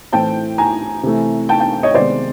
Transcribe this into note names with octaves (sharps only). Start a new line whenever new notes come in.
A2 E3 A3 C4 G5 A5
G#5 A#5
C3 E3 A3
G5 A5
G5 A5
C#5 D#5
C3 D#3 G#3 B3 C5 D5